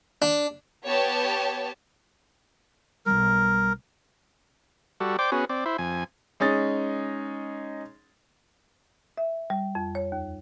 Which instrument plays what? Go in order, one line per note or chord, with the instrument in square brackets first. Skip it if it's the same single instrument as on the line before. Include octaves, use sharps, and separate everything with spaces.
[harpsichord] D4
[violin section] B3 G4 C#5 A5
[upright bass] B1 G3 [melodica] A#4
[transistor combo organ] G3 F#4 A4
C5 D5 G5 D6
B3 C#4 F#4 G#4
C4 D5
E4 C5
F2 G#5
[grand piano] G#3 C#4 D#4 A6
[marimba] E5
G3
F2
C#5
D#2